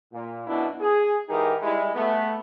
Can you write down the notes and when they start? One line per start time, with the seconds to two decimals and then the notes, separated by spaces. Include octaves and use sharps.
0.13 A#2
0.47 F#2 B2 B3 D4 E4
0.81 G#4
1.29 G#2 E3 D#4 G4 G#4 A#4
1.62 G3 G#3 E4
1.95 A3 B3